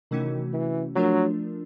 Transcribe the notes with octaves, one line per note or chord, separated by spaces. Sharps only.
C3 D#3 E3 A3 C#4 F#4
E3
F3 F#3 A3 D4 F4 A#4